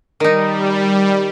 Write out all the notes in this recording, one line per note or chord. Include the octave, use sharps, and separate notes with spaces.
D#3 G3 D#4